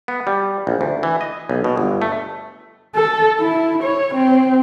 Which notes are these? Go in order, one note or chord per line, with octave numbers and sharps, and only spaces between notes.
B3
G3
A#1
D2
E3
D#5
B1
B2
G1
A3
A4
E4
C#5
C4